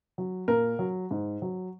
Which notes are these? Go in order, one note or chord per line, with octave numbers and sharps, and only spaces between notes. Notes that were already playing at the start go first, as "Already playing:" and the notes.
F#3
A#2 A#4
F#3
G#2
F#3